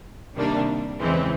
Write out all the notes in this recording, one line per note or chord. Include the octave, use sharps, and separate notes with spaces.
C3 D#3 G3 A#3 D4
E2 C#3 E3 G#3 C4